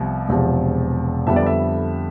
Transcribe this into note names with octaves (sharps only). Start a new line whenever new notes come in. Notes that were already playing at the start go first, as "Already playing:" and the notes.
Already playing: C2 C3 F3 B3
E1 E2 C3 F3
F2 D3 G3 B3 E5
D5
E5